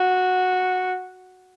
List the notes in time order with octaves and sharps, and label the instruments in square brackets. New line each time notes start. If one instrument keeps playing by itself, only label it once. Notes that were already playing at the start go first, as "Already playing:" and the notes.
Already playing: [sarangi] F#4